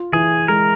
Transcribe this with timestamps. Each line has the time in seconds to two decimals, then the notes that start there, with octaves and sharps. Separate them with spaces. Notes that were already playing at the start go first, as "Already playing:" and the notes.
Already playing: F4
0.13 E3 G#4
0.48 G#3 A#4